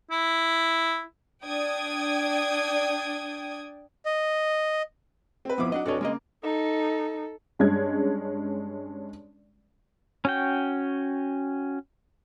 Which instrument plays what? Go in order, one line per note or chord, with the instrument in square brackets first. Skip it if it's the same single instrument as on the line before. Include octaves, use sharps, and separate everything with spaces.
[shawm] E4
[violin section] D4 D5 G5 D#6 G#6
[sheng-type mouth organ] D#5
[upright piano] C4 B4
[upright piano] F1 E4 D6 [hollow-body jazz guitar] F3 B3
[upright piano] F#3 F#5 [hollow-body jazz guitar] D4 D#5
[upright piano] F1 D4 C#5 [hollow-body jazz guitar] F#4 A4 D#5
[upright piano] C#3 A#3 [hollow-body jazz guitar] G#3 D#5
[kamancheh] D#4 [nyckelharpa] A4
[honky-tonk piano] G2 G#3 C#4 G#6
[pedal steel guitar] C#4 F#4 G5